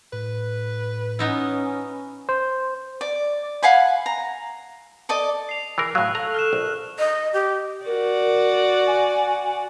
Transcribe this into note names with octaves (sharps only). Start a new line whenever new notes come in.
A2 B4
B3 C#4 D#4 E4
C5
D5
F5 F#5 G#5 B5
A#5
A4 D5 D#5
C7 F7
E3 G#4 A#4
A2 F#3 F5 C#6 E6 F#6
A4 A#5
F6 F#6 E7
A#1
D#5
G4
F#4 A#4 D5
G#5